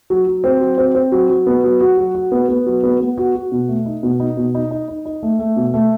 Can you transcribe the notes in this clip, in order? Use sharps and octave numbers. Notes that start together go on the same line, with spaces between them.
F#3
F#3
C4
F#3
C4
C4
F#3
F#3
B3
F#3
F#4
F#3
F#4
B3
B3
F#3
B3
B3
F#4
F#4
B2
A3
D#4
B2
D#4
B2
D#4
D#4
D#4
D#4
A3
A3
B2
A3